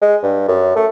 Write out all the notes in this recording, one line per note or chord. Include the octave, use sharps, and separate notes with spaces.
G#3
G2
F#2
A3